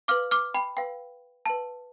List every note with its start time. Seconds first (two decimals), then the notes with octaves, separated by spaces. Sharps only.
0.08 B4 F5 D6 F6
0.31 D6 F6
0.54 G5 B5
0.77 B4 F5 G5
1.46 B4 F5 A5